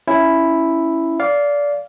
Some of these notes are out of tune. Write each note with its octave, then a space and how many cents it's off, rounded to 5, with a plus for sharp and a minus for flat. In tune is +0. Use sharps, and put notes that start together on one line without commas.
C#4 +5 E4 +0
D5 -20 F5 +0